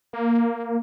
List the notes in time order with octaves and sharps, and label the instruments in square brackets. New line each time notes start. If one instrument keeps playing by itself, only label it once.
[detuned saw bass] A#3